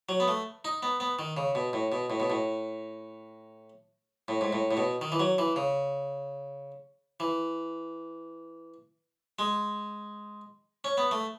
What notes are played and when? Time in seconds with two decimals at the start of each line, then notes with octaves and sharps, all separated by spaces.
0.09 F#3
0.20 B3
0.28 A3
0.65 D#4
0.83 B3
1.00 B3
1.19 D#3
1.37 C#3
1.55 B2
1.73 A2
1.92 B2
2.10 A2
2.20 B2
2.30 A2
4.28 A2
4.41 G#2
4.53 A2
4.71 A2
4.77 B2
5.01 D#3
5.12 E3
5.20 F#3
5.38 E3
5.56 C#3
7.20 E3
9.39 G#3
10.84 C#4
10.98 B3
11.11 A3